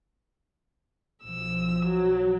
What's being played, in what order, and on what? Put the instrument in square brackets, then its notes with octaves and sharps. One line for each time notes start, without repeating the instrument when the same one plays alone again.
[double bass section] B1 F3 [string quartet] E6
[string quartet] F#3